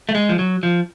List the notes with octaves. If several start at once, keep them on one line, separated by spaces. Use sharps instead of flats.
A3
G#3
F3
F#3
F3